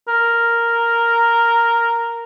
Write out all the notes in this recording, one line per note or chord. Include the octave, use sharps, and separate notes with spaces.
A#4